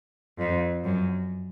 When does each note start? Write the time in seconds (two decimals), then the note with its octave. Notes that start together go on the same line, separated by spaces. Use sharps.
0.39 F2
0.84 F#2